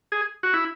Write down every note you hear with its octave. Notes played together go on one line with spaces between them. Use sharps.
G#4
F#4
E4